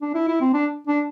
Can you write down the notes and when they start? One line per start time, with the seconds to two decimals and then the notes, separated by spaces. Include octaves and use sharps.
0.02 D4
0.14 E4
0.28 E4
0.41 C4
0.54 D4
0.87 D4